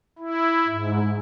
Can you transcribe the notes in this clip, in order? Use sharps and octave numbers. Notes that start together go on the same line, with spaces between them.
E4
G#2